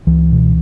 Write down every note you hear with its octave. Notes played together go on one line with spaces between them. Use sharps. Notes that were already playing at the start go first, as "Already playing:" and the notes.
C#2 E3
B2